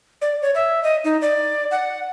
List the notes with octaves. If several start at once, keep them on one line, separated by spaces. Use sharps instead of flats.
D5
C#5
E5
D#5
D#4
D5
F#5